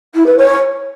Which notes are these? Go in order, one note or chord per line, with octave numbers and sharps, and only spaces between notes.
E4
B4
C#5